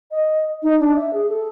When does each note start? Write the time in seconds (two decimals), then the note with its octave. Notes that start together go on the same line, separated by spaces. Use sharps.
0.11 D#5
0.63 D#4
0.80 D4
0.96 E5
1.13 G#4
1.29 A4